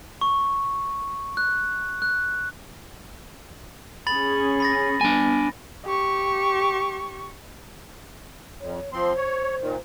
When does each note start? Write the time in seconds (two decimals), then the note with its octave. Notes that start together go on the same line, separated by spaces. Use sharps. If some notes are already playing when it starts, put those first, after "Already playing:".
0.21 C#6
1.37 F#6
2.02 F#6
4.07 C#4 G#4 B5 A6 F#7
4.60 B5 A6 A#6
5.01 G3 B3 D4 G#5
5.86 G4 C#6
8.60 F2 C#5
8.93 F3 C4 C5 C6
9.16 C#5
9.61 A#2 D#3